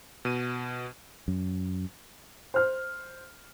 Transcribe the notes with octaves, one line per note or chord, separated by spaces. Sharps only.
B2 D#7
F#2
C5 F6